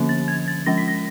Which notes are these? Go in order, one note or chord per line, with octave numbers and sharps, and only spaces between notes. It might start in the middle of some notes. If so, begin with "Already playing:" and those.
Already playing: D3 F3 A#3 C#4
A6
G#6
A6
F3 G#3 C#4 A#6
B6
A#6